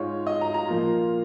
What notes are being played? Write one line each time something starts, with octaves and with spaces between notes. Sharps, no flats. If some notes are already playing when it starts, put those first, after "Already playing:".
Already playing: G#2 G#3 F4 C#5
D#5
A#5
A#5
A#2 F3 A#3 F4